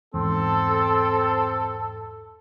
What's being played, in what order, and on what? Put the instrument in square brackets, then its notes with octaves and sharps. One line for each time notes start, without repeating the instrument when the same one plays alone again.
[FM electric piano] E2 G#2 [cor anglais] C4 [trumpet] A4